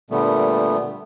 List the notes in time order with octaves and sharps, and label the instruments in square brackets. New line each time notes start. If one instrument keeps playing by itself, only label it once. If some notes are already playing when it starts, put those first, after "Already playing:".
[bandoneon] A#2 D3 G3 A3 B3